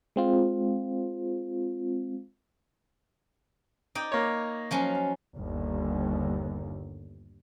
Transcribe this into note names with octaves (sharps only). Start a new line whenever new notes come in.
G#3 C4 F4
D#4 D5 G5
A#3 C#5
F3 F#3 C#4
G1 D#2